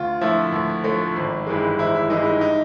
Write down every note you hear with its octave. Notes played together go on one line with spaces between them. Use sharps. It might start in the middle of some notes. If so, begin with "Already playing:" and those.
Already playing: D2 F4
D3 F3 A3 E4
D2
D3 F3 A3
G#1
G2 E3 G#3
G#1 E4
E4
G2 E3 G#3 D#4
D#4
D#4